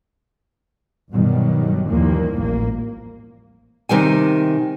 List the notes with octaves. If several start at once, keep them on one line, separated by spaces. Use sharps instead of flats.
G2 B2 D#3 F#3 G3
D#2 E3 F3 G3 A#3
A1 A#3
C3 D#3 G3 G#5